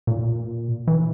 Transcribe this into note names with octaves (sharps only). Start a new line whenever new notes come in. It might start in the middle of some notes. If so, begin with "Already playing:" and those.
A#2
E3